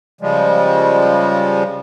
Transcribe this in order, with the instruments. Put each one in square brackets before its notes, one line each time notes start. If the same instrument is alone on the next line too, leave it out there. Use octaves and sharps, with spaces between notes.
[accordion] C#3 F3 G3 G#3